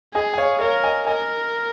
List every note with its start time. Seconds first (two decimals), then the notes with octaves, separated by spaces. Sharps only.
0.14 G#4 D#5 G#5
0.34 G#5
0.38 C#5 F5
0.61 A#4 C#5 F5
0.84 D#5 G#5
1.07 A#4 D#5 G#5